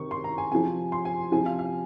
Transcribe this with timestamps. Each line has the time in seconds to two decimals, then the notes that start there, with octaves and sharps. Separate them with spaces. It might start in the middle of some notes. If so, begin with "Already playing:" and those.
Already playing: C3 D#3 C#6
0.11 C6
0.24 A#5
0.38 G#5
0.51 C3 F3 G#5
0.92 C6
1.05 G#5
1.32 C3 F3 G#5
1.46 F5
1.59 F5